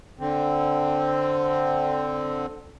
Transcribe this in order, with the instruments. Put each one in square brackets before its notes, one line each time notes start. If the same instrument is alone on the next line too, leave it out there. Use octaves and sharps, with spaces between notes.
[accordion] D3 C4